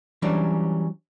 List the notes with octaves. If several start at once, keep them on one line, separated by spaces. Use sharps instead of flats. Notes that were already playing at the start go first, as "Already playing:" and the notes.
E3 F#3 G3 C#4 D4